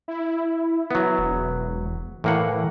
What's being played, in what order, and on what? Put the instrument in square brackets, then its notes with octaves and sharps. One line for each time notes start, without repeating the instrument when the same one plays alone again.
[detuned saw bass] E4
[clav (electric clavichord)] F#3 B3
[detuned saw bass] E1
[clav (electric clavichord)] A2 A#3 F#5 [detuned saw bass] E3